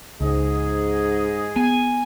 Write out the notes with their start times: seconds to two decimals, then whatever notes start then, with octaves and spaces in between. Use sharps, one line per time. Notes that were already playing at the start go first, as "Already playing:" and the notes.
0.21 C#2 G#2 G#4 D#5
1.56 B3 G#5